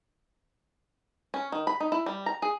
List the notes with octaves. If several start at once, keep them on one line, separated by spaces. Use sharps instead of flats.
C#4
D#3
B5
D#4
E4
G3
A#5
G#4